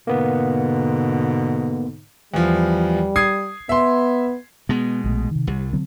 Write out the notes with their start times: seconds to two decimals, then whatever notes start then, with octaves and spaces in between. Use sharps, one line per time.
0.07 G#2 B2 D3 A#3 B3
2.34 E2 F3 G3
3.16 D#6 G#6 C7
3.69 B3 E5 C6
4.69 B2 G#3 B3
5.04 A#1 D#3 A3
5.31 C3 D#3
5.47 C2 G3
5.73 D3 F#3 C4